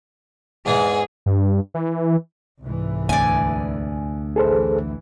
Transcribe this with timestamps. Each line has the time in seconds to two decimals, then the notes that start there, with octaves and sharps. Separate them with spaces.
0.66 E2 G#2 E3 G#4
1.26 G2
1.74 E3
2.65 C2 G#2 E3
3.09 D2 D5 G#5
4.36 A1 E3 G#4 A4 C5